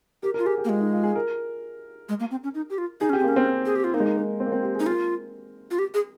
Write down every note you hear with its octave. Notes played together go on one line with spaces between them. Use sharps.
G4 A#4
A#4
F4
G4 G#4
G4
A#3
G#3 F4
D#4
F4
G#4
A#4
G#3
A#3
C4
C#4
D#4
G4
F4
D#4 G#4
C#4 G4
C4
A#3
C#4
C4
G#4
G4
F4
A#3 D#4
G#3
A#3
A#3
C4
A#3
C4
G4
G#4
D#4
F4 A#4
F4
G4
G#4